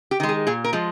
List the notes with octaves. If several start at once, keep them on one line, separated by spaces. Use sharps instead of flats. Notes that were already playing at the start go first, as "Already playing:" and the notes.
G4
D#3 G#3
G#4
A#2 G#4
A#4
F3 G#3